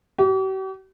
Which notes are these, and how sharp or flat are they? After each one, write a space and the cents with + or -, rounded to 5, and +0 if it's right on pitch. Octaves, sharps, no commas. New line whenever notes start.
G4 -45